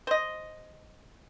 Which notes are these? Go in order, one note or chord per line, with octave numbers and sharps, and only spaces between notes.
C5 D#5